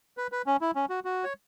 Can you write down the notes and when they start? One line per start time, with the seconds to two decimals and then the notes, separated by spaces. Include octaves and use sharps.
0.17 B4
0.32 B4
0.46 C#4
0.61 E4
0.75 C#4
0.90 F#4
1.05 F#4
1.24 C#5